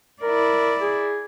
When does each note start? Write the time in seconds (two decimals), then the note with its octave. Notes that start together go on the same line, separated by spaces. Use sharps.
0.22 E4 A#4 D5
0.81 G#4